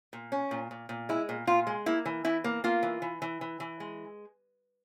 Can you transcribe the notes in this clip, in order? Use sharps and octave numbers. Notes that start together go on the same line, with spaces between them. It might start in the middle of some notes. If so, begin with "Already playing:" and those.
A#2
C#4
A#2
A#2
A#2
G#3 E4
A#2
A#2 F4
G#3
A#3 E4
E3
E3 E4
A#3
A#3 F4
E3
E3
E3
E3
E3
G#3